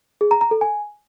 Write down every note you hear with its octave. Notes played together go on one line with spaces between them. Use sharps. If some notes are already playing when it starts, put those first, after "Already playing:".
G#4
A#5
A#5
A4
G#5